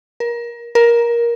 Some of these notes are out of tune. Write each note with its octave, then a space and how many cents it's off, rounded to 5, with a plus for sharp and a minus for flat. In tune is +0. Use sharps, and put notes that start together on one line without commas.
A#4 +25
A#4 +15